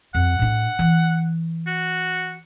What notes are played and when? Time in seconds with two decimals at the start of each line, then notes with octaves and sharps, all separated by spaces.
0.15 F2 F#5
0.39 A2 D4
0.79 E3
1.67 F#4